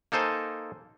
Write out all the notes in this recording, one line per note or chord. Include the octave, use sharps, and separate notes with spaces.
A#3 D#4 A4 C5 G#5